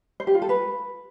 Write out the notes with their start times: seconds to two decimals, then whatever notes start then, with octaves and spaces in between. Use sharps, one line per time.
0.20 C5
0.27 G4
0.34 F4
0.42 A4
0.49 B4